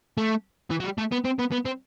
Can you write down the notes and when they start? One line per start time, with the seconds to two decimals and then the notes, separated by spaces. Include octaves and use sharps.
0.18 A3
0.70 E3
0.80 F#3
0.84 G3
0.98 A3
1.12 B3
1.25 C4
1.39 B3
1.52 B3
1.65 C4